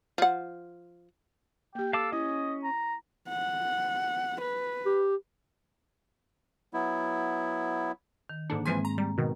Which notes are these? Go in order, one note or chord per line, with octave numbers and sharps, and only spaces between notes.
F3 F#5
A#3 G4 G5
A4 F5 A5 D6
C#4 E4 D#5
A#5
F#5
B4
G4
F#3 B3 E4
D#3
G#2 D3 A#3 D4
G#2 E3 F3 G#3 C4 G#5
A#5
G3 A#5
B2 D#3